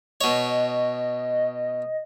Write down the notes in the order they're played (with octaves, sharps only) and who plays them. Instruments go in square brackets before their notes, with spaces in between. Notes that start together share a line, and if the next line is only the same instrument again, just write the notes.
[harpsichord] B2 C#5 [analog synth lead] D#5